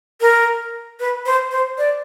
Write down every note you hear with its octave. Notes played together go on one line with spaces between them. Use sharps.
A#4
B4
C5
C5
D5